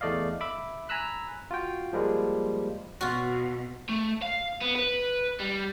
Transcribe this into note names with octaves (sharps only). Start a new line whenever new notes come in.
E2 A3 D5 D#5 F5
E5 B5 D6
G#5 A#5 B5 E6 F#6
F4 F#4 G5
F3 G3 G#3 A#3
B2 F4 F#4
A3
F5
B3
B4
G3